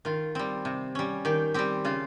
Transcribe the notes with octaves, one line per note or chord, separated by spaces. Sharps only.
D#3 F4
G3 C4
C3
G3 C#4
D#3 G4
G3 C4 G4
C#3 F4